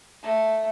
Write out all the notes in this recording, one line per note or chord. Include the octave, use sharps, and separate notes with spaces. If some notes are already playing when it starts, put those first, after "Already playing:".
A3